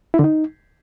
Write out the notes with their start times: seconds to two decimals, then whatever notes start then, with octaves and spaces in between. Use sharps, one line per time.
0.14 E4
0.19 D3
0.24 D#4